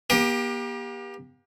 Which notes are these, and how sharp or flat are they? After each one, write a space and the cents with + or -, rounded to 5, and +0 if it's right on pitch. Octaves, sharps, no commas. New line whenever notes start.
A#3 +45 G4 +15 D#6 -5